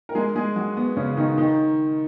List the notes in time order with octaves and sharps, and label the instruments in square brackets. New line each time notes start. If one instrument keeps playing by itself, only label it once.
[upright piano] A#4
G#3 G#4
G#3 G#4
F#3 F#4
B3
C#3 C#4
D#3 D#4
D#3 D#4